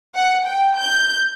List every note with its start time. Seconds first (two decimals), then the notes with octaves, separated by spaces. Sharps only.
0.15 F#5
0.47 G5
0.79 G6